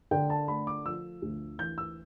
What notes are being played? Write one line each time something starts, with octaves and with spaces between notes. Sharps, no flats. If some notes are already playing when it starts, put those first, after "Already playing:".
D3 G5
A5
A3 B5
D6
F3 E6
D2
E3 G6
E6